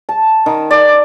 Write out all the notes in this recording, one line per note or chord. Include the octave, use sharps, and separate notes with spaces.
A5
D#3
D5